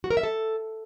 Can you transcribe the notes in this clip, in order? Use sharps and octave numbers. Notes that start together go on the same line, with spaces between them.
F#4
A#4
E5
A4